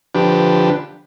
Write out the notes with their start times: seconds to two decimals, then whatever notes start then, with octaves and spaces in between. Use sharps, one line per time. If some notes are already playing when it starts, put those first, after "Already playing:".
0.15 D3 F3 D4 G4 B4